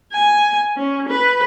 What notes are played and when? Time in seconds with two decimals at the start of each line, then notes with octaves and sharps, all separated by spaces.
0.13 G#5
0.77 C#4
1.09 B4